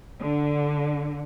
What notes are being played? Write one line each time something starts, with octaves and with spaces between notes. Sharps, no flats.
D3